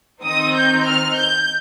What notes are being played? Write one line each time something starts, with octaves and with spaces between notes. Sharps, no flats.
D#3 C4 D#4 D#6
G6
F6
G6